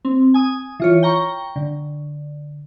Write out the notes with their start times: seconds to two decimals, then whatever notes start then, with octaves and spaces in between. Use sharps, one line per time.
0.05 C4
0.34 G#5 D#6
0.80 E3 F4 C#5
1.03 G5 A#5 C#6
1.56 D3